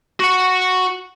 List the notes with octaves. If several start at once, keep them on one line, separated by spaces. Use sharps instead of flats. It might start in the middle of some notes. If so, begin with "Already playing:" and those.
F#4 F#5